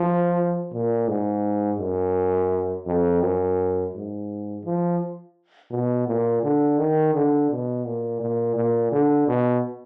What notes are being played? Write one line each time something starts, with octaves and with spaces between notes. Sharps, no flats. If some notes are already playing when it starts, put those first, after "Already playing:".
Already playing: F3
A#2
G#2
F#2
F2
F#2
G#2
F3
B2
A#2
D3
D#3
D3
B2
A#2
A#2
A#2
D3
B2